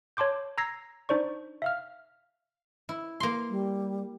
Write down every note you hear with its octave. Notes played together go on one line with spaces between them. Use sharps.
C#5 A5 C6 D6 G6
A#5 E6 G#6 A#6 C7
D4 D#4 C5 D5 C#6
E5 F5 F6
E4
A#3 C6
G3